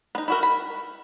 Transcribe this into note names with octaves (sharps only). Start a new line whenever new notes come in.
B3 D#4
E4 F#4 A#4
B5